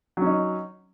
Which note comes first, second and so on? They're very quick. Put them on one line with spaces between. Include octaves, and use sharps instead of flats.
F#3 C#4 D#4